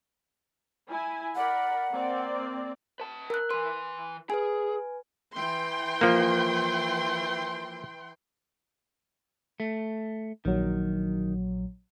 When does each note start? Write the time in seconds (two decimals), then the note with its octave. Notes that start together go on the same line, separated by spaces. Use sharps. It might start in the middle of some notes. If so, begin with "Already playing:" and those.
0.89 E4 G#5
1.36 A#4 D5 F#5 B5
1.92 A#3 C4 D5
3.00 B4 A5
3.30 A#4 F#6
3.51 E3 B4 C6
4.30 G#4 B4 G#5
5.36 E3 G5 C6
6.01 F3 A#3
9.60 A3
10.45 A#1 D#3 F#3